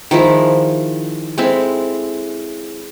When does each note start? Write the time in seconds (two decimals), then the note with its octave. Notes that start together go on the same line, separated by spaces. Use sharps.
0.11 D#3 F3 G#3 E4
1.38 G#3 C4 E4 A4